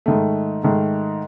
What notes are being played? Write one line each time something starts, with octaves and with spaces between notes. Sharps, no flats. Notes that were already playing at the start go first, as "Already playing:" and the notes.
G#2 D#3 A3
G#2 D#3 A3